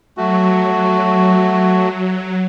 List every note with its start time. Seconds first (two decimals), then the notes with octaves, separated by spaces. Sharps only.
0.17 F#3 A3 F#4